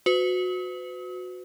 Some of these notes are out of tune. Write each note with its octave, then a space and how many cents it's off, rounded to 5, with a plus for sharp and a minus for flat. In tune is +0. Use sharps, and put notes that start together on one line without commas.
F#4 -20 B4 +40 D#6 +45